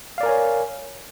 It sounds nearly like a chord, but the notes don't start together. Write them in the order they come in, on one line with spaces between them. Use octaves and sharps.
F5 D5 A#4 G#5 C#5